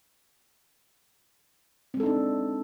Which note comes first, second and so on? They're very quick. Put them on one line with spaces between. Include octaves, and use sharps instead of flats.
C4 G#3 A4 D#4 D4